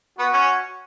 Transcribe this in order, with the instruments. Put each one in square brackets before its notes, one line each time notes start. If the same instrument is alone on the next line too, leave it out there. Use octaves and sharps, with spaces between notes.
[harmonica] B3 [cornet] F#4
[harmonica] C#4